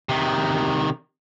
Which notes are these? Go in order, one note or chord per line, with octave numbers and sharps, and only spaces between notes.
C3 D#3